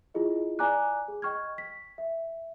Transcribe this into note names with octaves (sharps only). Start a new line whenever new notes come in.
E4 F4 G#4 D#5
D5 G#5 A#5 D6 F#6
G#4
D#5 G5 C#6 F6 G#6
B6
E5